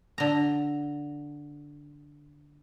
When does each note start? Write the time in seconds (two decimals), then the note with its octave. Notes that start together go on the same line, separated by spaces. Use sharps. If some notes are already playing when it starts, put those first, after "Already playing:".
0.18 D3 A#5